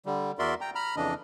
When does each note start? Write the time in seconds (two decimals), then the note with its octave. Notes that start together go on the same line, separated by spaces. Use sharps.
0.06 D3 G3
0.39 E2 F#4 A#4 D5 E5 C6
0.61 G5 A#5
0.75 A#5 B5 F6
0.96 F2 C#3 E3 D4 D#5